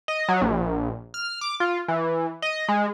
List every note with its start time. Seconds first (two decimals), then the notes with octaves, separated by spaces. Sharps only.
0.08 D#5
0.28 F#3
0.41 A#1
1.14 F6
1.41 D6
1.60 F4
1.88 E3
2.42 D#5
2.68 G#3